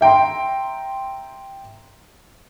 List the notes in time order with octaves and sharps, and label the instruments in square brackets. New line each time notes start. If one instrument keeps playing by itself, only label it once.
[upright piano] E5 G5 A#5 C6